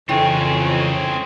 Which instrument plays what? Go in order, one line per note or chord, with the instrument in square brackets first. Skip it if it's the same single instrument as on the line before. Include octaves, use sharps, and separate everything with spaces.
[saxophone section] F2 [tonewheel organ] C#3 E3 C#5 [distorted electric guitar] C4 G#4 [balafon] E4 G5